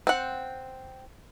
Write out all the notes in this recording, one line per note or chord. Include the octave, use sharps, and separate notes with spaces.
C4 F#5